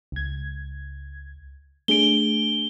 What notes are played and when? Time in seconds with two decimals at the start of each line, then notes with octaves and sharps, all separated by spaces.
0.12 C#2 G#6
1.88 A3 D4 G#4 D7 G7